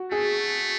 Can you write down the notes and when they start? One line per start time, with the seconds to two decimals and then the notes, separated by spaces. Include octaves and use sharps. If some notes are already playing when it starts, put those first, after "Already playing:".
Already playing: F#4
0.12 A3 G#4